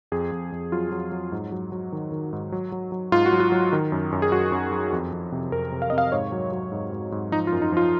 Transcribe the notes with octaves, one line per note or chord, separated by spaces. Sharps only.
F2 G#4
F2
F2
F#3 F4
F#3
F#3
G#2
F#3
F#3
D#3
D#3
G#2
F#3
F#3
F#3
G#2 F4
F#4
F#3
F4
F#3
D#3
F#2
F#2
G#4
F#2 F#4
F#2
F#3
F2
F2
C3
F2 A#4
C3
F5
C3 D#5
F5
G#2 C#5
F#3
F#3
G#2
G#2
G#2
F3 D#4
F4
F#2
D#4
F3 F4